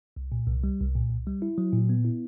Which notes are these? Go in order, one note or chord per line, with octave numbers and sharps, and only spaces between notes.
C2
A#2
C2
G3
C2
A#2
C2
G3
E4
F#3
A#2
B3
E4